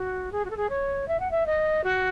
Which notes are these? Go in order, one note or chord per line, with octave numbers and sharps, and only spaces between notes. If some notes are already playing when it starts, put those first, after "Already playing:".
Already playing: F#4
G#4
F#4
A4
G#4
C#5
E5
F#5
E5
D#5
F#4